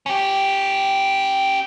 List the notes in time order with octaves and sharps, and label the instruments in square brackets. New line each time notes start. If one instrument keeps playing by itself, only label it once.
[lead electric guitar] C#4 G4